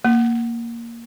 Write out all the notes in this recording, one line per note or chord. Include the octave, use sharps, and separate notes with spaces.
A#3